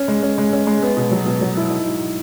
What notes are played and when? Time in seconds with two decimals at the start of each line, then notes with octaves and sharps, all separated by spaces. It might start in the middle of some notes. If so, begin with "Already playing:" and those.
Already playing: C#4
0.08 G#3
0.23 C#4
0.38 G#3
0.53 C#4
0.67 G#3
0.82 B3
0.97 B2
1.11 F#3
1.26 B2
1.41 F#3
1.57 E4
1.70 D#4
1.85 G#2